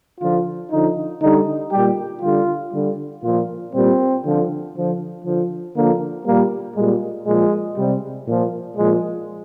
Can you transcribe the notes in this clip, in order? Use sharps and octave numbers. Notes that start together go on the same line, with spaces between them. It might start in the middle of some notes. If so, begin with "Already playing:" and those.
D3 F3 F4
D3 F3 D#4
D3 G3 D#4
A#2 G3 G4
D3 G3 F4
D3 G3
A#2 F3 F4
A#2 G3 C4
D3 F3
D3 F3
D3 F3
D3 F3 A#3
A#2 G3 A#3
A#2 G3 G#3
A#2 F3 G#3
C3 G3
A#2 F3
A#2 F3 G#3